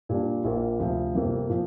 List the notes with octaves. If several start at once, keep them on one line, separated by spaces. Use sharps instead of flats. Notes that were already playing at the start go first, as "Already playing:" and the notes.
A#2 G3 D4
A#1 A#2 A#3
D2 C3 F3
G1 F2 C3 A#3
A#2 F3